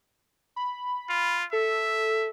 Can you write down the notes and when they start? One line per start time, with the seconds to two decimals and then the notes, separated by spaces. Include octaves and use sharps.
0.56 B5
1.09 F4
1.53 A4 E5